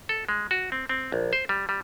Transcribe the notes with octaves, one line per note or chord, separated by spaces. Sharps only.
A4
G#3
F#4
C4
C4
A#1
C5
G3
G3